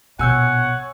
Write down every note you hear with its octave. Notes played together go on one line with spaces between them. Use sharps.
A#1 B2 C#5 F#5 G#5 E6 G6